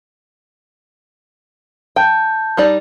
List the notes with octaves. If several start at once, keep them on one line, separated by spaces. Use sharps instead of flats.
G5 A5 G6
G3 D#4 D5